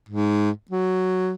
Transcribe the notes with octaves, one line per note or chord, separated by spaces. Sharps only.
G#2
F#3